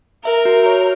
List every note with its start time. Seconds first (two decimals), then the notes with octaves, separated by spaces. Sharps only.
0.24 A#4 E5
0.45 F#4
0.66 C#5